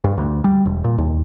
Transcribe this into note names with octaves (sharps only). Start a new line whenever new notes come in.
G2
D2
G3
E1
A#2
D#2